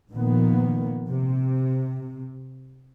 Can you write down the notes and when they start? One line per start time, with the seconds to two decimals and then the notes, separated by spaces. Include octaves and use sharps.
0.12 A#2 D#3 F3 A#3 B3
1.08 C3